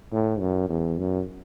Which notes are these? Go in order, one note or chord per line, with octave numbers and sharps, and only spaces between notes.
A2
F#2
E2
F#2